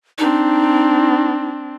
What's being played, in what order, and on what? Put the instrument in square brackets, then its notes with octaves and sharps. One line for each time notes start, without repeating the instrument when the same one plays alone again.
[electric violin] C4 D4 [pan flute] D#4